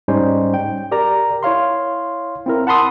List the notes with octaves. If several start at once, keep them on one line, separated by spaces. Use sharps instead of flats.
G#2 G3 C#4 D#4 C5 D#5
G5
G4 A#4 D5 A#5
E4 C#5 F5 C6
C4 E4 A#4
F#5 A5 B5 C6 D#6 E6